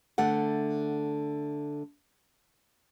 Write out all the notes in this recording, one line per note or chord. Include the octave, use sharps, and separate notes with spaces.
D3 A3 F#5